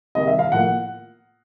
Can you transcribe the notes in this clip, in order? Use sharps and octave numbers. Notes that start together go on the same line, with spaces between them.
C3 D#3 G3 D#5
E5
F5
A2 F3 A#3 F#5